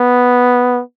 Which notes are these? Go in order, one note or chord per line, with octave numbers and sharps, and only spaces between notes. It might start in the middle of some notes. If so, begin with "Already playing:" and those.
Already playing: B3